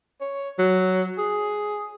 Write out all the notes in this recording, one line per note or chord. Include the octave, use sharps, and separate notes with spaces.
C#5
F#3
G#4